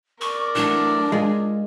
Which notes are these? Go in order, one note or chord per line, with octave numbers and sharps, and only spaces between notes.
A#4 D5 C#6
E3 F#3 A3 D4
G#3 F4 G#4